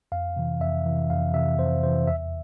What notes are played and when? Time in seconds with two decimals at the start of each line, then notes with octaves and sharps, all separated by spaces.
0.12 F2 F5
0.36 C3 E3
0.60 F2 E5
0.86 C3 E3
1.10 F2 F5
1.34 C3 E3 E5
1.59 F2 C5
1.83 C3 C5
1.87 E3
2.07 E2 E5